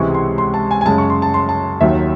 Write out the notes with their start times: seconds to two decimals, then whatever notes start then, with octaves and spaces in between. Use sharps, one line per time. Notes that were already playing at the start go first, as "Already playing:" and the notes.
Already playing: C#2 C3 E3 G#3 C#6
0.15 C6
0.38 C6
0.54 A5
0.71 G#5
0.81 G#5
0.86 F#2 C#3 G#3 A5
0.98 C#6
1.10 C6
1.22 A5
1.34 C6
1.49 A5
1.81 D#2 D#3 F#3 E5